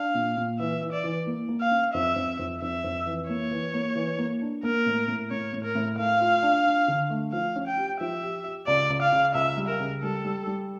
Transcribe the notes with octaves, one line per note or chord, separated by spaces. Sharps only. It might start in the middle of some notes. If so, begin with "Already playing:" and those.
Already playing: D4 F5
A#2
A#2
E3 E5
E3
D5
E3
A#3
A#3
F5
C#4
F2 E5
F2
F2
F2 E5
F2
E3
A#3 C#5
E3
A#3
E3
A#3
D4
A#3 A#4
A2
A2
A2 C#5
A2
A#4
A2
A3 F5
F4
D4
D4
D3
A3
F3 F5
C#4
G5
G4
F3 E5
G4
G4
C#2 D5
C#2
F5
C#3
C#2 E5
G3
A#4
C#3
G3 A4
G3
G3